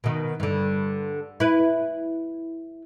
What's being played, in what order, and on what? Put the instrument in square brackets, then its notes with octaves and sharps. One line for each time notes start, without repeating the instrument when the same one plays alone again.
[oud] B2 D#3
G2 D3
E4 B4